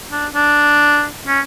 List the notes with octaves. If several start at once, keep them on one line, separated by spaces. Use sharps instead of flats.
D4
D4
C#4